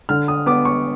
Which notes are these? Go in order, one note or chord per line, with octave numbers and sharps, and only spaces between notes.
D3 F6
D#6
B3 D6
C#6